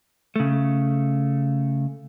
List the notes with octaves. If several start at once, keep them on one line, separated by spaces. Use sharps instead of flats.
C#3 A3